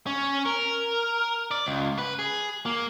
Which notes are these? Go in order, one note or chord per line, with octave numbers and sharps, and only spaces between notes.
C#4
A#4
D5
C#2
B4
G#4
A#3